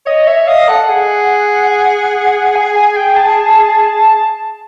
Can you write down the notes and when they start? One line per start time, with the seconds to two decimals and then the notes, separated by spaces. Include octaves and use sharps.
0.06 C#5 D#5
0.27 C#5 E5
0.47 D#5 F5
0.69 A4 F#5
0.89 G#4
2.55 G#5
2.75 G#5
2.96 G5
3.16 A5